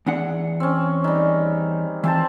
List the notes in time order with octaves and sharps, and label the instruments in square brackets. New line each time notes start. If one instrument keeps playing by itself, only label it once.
[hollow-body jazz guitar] E2 D4 F#5
[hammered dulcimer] C4 C#4
D#3 G3
[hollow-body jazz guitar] E3 [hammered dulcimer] C4 C5 A5